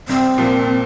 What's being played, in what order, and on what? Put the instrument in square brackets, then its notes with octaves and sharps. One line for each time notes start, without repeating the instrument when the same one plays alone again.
[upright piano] C2 [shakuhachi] C4
[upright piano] A#2 F3 A#3